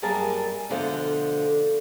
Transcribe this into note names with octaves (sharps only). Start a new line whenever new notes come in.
F#2 G3 A#3 G#4 A#4 A5
D2 B2 D3 F3 C5 F5